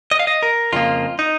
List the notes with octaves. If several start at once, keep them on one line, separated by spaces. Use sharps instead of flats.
D#5
F5
D#5
A#4
F2 C#3 F3 A#3 F4
D#4